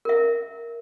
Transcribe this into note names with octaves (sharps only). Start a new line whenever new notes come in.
A#4 E5